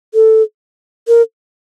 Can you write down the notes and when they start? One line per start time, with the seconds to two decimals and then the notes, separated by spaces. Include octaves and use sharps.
0.14 A4
1.08 A#4